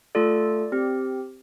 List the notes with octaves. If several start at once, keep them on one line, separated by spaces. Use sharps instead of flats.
A3 F4 A4 D5
C4 G4